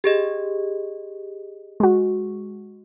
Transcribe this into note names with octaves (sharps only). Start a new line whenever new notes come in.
G4 G#4 D#5
G#3 F#4